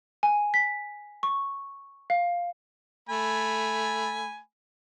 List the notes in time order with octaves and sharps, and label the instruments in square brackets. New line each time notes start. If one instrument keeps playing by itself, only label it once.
[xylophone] G#5
B6
C#6
F5
[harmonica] A3 G#5 B5